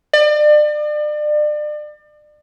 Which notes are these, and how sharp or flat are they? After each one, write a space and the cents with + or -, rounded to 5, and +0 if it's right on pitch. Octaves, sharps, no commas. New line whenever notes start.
D5 +35